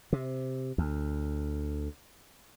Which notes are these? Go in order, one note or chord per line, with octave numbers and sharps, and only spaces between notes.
C3
D2